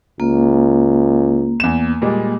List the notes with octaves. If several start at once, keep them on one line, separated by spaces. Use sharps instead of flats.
C#2 A#3
E2 E7
A#2 G3 G#3